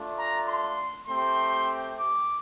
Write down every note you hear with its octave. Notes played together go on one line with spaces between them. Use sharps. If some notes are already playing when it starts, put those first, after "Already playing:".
Already playing: A3 D4 F4
A#5
C6
A3 C4 G4 C6
D6